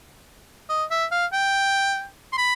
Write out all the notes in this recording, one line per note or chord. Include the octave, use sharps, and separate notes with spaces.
D#5
E5
F5
G5
C6
B5